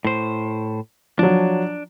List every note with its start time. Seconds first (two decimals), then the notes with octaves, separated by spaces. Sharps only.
0.05 A2 C5
1.19 F3 F#3 D4